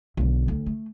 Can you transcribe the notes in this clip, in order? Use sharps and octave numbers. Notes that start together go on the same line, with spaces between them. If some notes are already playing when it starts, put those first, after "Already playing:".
B1 D3
D2
A3